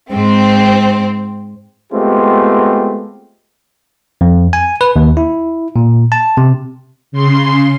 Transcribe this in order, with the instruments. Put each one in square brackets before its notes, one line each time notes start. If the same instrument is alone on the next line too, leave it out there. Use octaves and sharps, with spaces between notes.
[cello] G#2 [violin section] C4
[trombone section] G#3 A3 B3 C4 F4 G4
[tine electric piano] F2
G#5
B4
D#2
E4
A#2
A5
C3
[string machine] C#3 C6